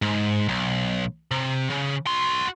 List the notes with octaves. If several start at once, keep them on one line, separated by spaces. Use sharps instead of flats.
G#2
B1
C3
C#3
F#4 C6